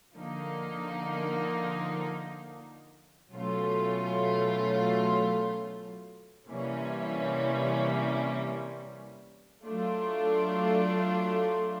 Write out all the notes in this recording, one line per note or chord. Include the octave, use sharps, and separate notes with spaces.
D3 F3 A#3 D#4
B2 F#3 A3 C#4 F4
C3 E3 G3 A#3 C#4
F#3 A3 D4 F4